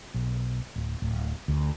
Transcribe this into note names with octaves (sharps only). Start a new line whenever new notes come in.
B1
D1
D1
D2